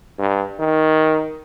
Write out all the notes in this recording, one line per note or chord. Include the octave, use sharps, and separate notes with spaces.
G2
D#3